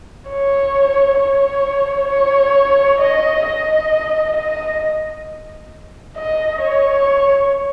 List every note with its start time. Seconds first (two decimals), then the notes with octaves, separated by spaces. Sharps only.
0.29 C#5
1.19 C#5
2.09 C#5
3.00 D#5
3.46 D#5
4.36 D#5
6.17 D#5
6.62 C#5